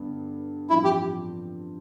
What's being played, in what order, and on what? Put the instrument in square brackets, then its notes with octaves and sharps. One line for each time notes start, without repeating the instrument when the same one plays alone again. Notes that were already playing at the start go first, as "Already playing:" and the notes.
Already playing: [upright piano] G2 D3 B3
[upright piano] A1 G2 F3 C4 [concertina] E4
[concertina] G4